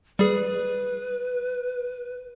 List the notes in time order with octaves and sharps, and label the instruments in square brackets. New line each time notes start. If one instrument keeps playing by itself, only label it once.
[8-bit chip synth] G3 G#4 [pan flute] B4